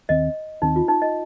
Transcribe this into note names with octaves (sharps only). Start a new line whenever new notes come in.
D#2 D#3 C4 D#5
D#2 D#3 C4 D#4
F4
D#4
D#5